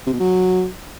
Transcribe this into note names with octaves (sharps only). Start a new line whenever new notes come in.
C3
B2
F#3